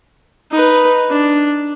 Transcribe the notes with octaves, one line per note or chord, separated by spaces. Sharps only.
D#4 B4
D4